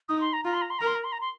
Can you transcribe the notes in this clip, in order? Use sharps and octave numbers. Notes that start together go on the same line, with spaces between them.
D#4 D#6
C6
A#5
F4 A#5
C6
A#5
C6
A#4 A#5
C6
A#5
C6
A#5
C6